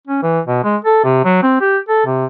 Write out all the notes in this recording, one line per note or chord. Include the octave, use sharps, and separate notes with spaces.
C#4
E3
B2
G#3
A4
C3
F#3
C4
G4
A4
C3